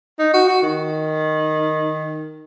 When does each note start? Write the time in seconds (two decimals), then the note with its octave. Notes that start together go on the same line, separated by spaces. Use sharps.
0.19 D#4
0.34 F#4
0.48 F#4
0.63 D#3